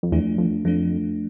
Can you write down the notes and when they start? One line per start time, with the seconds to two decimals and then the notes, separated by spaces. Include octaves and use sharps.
0.03 F2
0.12 E2 F3 A3 D4
0.38 F2
0.65 F2 F3 A3 D4